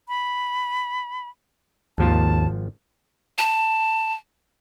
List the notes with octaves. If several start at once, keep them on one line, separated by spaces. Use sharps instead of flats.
B5
G#1 D#2 F3 F4 A5
A5